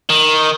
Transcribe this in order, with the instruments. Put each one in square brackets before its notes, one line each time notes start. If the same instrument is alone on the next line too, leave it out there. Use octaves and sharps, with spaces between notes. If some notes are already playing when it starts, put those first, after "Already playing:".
[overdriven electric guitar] D#3